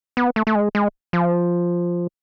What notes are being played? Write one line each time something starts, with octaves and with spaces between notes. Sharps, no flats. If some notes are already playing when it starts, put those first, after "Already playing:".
B3
A3
A3
G#3
G#3
F3